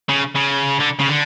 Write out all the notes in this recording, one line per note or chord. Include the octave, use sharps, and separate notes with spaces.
C#3
C#3
D3
C#3
D3